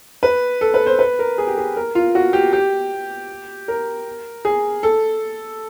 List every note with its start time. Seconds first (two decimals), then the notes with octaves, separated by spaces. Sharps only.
0.23 B4
0.61 A4
0.74 B4
0.86 C5
0.99 B4
1.19 A#4
1.38 G#4
1.47 G4
1.57 G#4
1.76 A#4
1.95 F4
2.15 F#4
2.33 G4
2.53 G4
3.68 A#4
4.45 G#4
4.83 A4